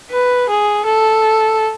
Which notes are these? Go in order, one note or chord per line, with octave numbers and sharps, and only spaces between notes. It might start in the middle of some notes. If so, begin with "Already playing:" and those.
B4
G#4
A4